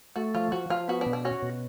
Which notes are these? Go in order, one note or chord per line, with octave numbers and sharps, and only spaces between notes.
A3 F#4
F3 F4
F3 F#4
F3 F4
B3 F#4
D4
B2
D4
C#4 F#4
B2